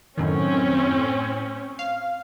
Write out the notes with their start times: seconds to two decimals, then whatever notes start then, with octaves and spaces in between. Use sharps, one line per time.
0.17 F#2 A2 D#3 C4 C#4
0.78 A2
1.79 F5